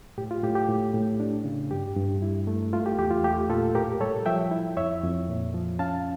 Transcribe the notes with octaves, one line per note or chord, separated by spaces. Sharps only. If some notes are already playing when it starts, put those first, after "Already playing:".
A2 G4
F4
A2 G4
G4
A2
A2
D4
C#3
G2 G4
G2
E4
A3
A3 F4
G4
E2 G4
F4
A3 G4
A#2 F4 A4
A2 G4 A#4
G3 A4 C#5
F3 E5 G5
E4
F2 C#5 E5
F2
A#2
F3
C#4 F5 A5